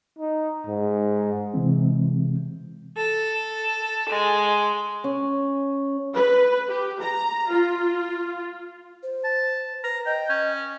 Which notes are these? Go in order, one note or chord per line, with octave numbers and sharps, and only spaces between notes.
D#4
G#2
C3 E3 G#3 C4
A4
G#3
C#4
B4
G4
A#5
F4
C5
A5
B4 A#5
D#5 G5
C#4